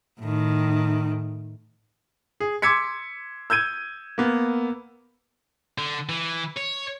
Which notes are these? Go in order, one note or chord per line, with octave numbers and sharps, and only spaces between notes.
A2 D#3
G#4
C6 D6 E6 G#6 B6 C#7
E6 G6 G#6 D#7
A#3 B3
D3
E3
C#5